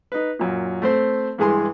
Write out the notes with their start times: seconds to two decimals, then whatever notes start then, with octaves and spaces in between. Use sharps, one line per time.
0.12 D#4 B4
0.39 F#2 A#2
0.82 A3 C4 C5
1.38 G2 E3 G#3 G#4 G#5 C6